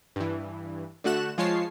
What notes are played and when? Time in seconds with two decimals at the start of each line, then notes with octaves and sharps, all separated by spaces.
0.16 G2 E3
1.04 D3 A3 F#4 F#6 E7
1.38 F3 G#3 F4 C#5 A5 C7